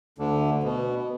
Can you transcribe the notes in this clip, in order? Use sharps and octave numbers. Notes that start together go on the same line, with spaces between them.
D2 D3
B2